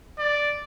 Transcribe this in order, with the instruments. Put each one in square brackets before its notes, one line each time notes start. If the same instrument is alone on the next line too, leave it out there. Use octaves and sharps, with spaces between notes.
[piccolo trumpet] D5